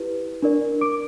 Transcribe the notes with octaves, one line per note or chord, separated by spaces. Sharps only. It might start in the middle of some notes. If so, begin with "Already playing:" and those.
Already playing: E4 G4 B4
D4 A#4 D5
D6 D7